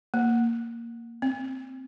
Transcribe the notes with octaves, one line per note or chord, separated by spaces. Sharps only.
A#3
C4